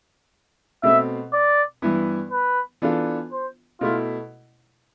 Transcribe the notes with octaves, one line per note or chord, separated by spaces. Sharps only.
B2 A3 C4 E5
D5
G2 E3 B3 E4
B4
E3 B3 D4 F4 A4
C5
B2 A3 E4 F4